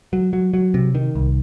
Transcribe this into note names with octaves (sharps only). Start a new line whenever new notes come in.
F#3
F#3
F#3
C3
D#3
C2